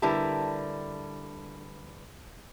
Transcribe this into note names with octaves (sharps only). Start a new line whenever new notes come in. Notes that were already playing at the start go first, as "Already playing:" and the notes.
D3 G3 E4 A#4 B4 A5